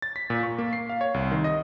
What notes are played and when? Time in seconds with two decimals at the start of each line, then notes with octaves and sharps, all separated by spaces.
0.02 A6
0.16 B6
0.30 A#2
0.43 C#6
0.58 A#3
0.73 C7
0.89 F5
1.01 C#5
1.14 C2
1.31 D#3
1.44 D#5